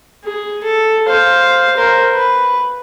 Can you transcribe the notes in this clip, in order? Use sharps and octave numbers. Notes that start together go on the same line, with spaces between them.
G#4
A4
C5 F5
A#4 C5
B4